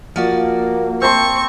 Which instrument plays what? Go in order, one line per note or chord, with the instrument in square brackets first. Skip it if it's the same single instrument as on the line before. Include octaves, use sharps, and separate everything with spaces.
[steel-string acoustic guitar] F3 F#4 D5 [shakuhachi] A#3
[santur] C4 A5 C6 [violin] C#6